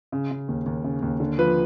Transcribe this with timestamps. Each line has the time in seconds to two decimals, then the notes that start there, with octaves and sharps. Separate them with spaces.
0.12 C#3
0.31 C#3
0.48 D#2
0.66 D#2
0.84 C#3
1.02 D#2
1.20 D3
1.38 F3 B4